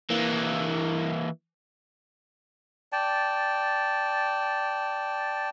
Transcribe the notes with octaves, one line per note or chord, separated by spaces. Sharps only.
E3 A#3
D5 G5 A5